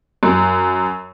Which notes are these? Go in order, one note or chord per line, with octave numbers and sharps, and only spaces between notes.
F#2